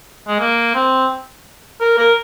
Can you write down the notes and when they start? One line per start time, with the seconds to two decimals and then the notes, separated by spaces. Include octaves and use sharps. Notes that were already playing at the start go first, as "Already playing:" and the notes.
0.28 G#3
0.39 A#3
0.75 C4
1.81 A#4
1.98 A#4